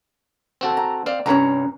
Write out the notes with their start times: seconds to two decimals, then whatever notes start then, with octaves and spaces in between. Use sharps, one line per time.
0.61 C4 F#4 A4
0.77 A#5
1.06 C4 D5 F5
1.26 C2 G2 C#4 A#4 C#5 A#5